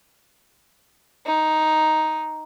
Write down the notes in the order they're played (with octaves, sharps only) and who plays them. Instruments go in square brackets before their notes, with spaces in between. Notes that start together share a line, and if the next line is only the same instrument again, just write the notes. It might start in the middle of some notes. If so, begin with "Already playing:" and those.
[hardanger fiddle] D#4